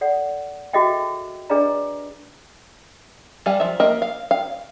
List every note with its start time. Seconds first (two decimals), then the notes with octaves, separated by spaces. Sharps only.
0.01 A4 D5 F#5
0.73 F#4 G#4 A4 D#5 E5 G5
1.50 D4 G#4 B4 D5 D#5 A#5
3.46 G3 F5 G#5
3.60 F3 E5
3.80 A#3 A#4 D#5 E5
4.02 F5
4.31 F5